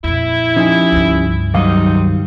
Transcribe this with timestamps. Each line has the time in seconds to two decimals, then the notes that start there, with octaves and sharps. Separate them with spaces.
0.04 F2 A#2 E4
0.56 F3 C#4 D#4 G4 G#5
0.92 C#2 G2
1.55 C3 D#3 F#3 G3 C4 D#4 F5